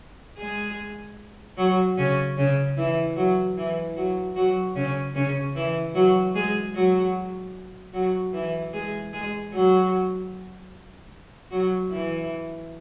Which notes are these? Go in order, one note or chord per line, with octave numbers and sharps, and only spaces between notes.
G#3 G#4
F#3 F#4
C#3 C#4
C#3 C#4
E3 E4
F#3 F#4
E3 E4
F#3 F#4
F#3 F#4
C#3 C#4
C#3 C#4
E3 E4
F#3 F#4
G#3 G#4
F#3 F#4
F#3 F#4
E3 E4
G#3 G#4
G#3 G#4
F#3 F#4
F#3 F#4
E3 E4